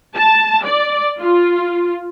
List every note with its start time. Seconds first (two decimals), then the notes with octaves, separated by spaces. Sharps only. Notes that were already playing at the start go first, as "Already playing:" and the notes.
0.15 A5
0.64 D5
1.20 F4